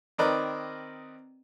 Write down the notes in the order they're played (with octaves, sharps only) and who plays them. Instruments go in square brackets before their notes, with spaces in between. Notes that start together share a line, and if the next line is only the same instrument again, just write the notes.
[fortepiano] D#3 C4 A#4 B4 D5 D#5